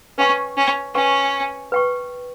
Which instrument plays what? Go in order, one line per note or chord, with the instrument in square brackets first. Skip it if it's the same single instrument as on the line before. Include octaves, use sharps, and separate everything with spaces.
[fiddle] C#4 [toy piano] B4 G5 C#6
[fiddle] C#4
[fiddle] C#4 [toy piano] B4 G5 C#6
[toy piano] B4 G5 C#6